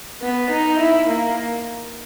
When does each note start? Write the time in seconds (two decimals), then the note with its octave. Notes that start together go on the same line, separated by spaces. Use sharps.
0.22 B3
0.51 D#4
0.80 E4
1.09 A#3